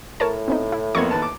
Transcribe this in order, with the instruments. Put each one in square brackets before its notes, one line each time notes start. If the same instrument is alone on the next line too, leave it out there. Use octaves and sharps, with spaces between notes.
[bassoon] A2 [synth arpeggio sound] A#4 C#5 A5
[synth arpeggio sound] B3 C4 D#4
E4
[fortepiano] F2 A#3 B3 [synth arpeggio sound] C#6 G#6
[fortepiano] D#2 B4 A5
D6